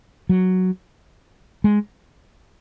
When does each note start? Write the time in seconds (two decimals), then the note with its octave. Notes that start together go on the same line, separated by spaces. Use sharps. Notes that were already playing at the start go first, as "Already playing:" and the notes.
0.29 F#3
1.64 G#3